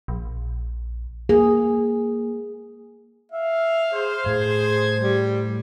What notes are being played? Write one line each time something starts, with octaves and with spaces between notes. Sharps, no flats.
A#1
A#3 G#4
E5 F5
G#4 C5
A2 G#4 G#6
G3